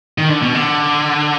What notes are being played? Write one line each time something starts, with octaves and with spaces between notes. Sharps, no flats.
D#3
D3
B2
D3